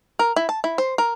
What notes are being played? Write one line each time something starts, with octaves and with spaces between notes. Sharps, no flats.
A#4
E4
A5
E4
C5
A#4